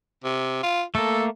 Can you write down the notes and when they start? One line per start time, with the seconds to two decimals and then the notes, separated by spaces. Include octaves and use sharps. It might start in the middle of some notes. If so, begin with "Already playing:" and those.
0.24 C3
0.63 F4
0.95 A3 A#3 A4